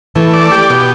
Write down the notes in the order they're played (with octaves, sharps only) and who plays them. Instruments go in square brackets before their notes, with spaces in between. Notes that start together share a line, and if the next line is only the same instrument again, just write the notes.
[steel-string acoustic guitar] E3 [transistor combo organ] A3
[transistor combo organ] D5
G4
B2